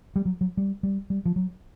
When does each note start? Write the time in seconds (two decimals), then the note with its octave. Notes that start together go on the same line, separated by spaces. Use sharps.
0.16 G3
0.25 F#3
0.41 F#3
0.57 G3
0.83 G3
1.10 G3
1.25 F3
1.36 F#3